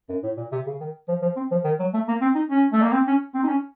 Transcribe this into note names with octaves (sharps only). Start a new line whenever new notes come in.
F#2
A2
A#2
C3
C#3
D#3
F3
F3
C4
F3
D#3
F#3
A3
A#3
C4
D#4
C#4
A3
A#3
C4
C#4
C4
D#4
C#4